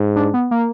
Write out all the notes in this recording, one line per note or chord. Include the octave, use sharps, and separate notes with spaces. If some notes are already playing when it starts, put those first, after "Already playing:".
Already playing: G#2
D4
B3
A#3